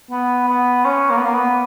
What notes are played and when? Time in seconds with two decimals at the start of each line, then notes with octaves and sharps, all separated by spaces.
0.11 B3
0.48 B3
0.85 C#4
1.10 A#3
1.18 B3
1.25 A#3
1.34 B3